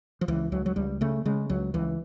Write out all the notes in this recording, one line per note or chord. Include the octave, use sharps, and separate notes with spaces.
F3
C#2 E3
C#2 F#3
F#3
C#2 G3
C#3 A3
C#3 G#3
C#2 F#3
C#2 E3